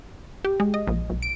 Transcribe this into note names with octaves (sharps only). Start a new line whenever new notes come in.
G4
G#3
D#5
A#1
B1
D7